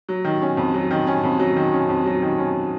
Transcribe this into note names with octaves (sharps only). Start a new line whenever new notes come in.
F#3
D#3
C#4
F2
F#3
D#3
C#4
F2
F#3
D#3
C#4
F2
F#3
D#3
C#4